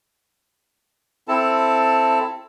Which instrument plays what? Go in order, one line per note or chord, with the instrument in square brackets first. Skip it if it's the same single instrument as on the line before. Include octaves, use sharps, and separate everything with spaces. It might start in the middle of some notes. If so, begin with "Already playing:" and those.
[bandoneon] C4 E4 A4 A5